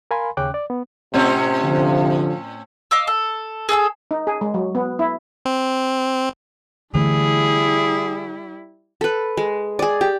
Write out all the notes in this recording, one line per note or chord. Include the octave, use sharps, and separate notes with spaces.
A#4 F5 G#5 B5 C6
D#2 C#3 C#4 G5 D6 F#6
D5
B3
A2 C3 C4 C#4
D3 F3
D#5 F5 D6 E6
A4
G#4 A4 D#6 E6
D#4
G#4
G#3
F#3
B3
E4
C4
D3 E3 G3 A3 E4 G#4
A4 B4
G#3
G#4 D5
G4